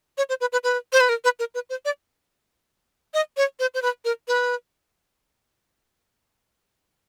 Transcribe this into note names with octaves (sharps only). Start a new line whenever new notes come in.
C#5
C5
B4
B4
B4
C5
B4
A#4
B4
A#4
B4
C5
D5
D#5
C#5
C5
C5
B4
A#4
B4